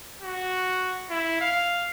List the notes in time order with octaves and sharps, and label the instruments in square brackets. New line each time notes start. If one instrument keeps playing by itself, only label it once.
[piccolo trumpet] F#4
E4
F5